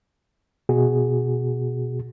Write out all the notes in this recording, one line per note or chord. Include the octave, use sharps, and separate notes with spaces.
B2 F#4 G#4